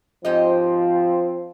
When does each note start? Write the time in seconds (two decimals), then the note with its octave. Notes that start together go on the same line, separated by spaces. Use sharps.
0.25 G#2 F3 C4 G4 D#5